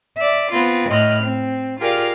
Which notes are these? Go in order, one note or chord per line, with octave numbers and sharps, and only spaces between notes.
D5 E5
B3 C4 F4
A2 D#5 F6 F#6
C4
F4 G4 G#4 A#4 D5 F5